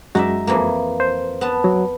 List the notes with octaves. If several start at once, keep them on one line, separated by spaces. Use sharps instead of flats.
F#2 G#3 D#4 F#4 D5 E5
F2 E3 A#3
C5
B3 A5
F#3